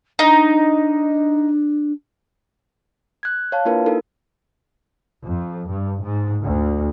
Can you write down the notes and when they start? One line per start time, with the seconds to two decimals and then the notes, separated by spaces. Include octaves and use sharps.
0.19 D4 D#4
3.23 F#6 G#6
3.52 C#5 F5 A5
3.65 A#3 D4 E4 F4 A#4 B4
3.86 D#4 A4 A#4
5.25 F2
5.71 G2
6.04 G#2
6.43 D2